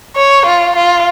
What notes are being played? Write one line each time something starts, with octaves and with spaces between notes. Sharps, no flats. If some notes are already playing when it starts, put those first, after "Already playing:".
C#5
F4
F4